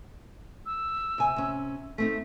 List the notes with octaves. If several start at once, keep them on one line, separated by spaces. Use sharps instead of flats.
E6
C3 G#5
C3 C#4
A3 C4 D#4 B6